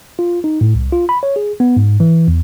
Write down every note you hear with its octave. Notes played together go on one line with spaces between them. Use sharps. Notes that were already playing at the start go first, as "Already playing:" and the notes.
F4
D#4
A2
C2
F4
B5
C#5
G#4
B3
G#2
E3
E2